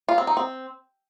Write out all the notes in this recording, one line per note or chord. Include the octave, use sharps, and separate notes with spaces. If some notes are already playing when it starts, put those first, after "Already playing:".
F4
C4
D#4
C4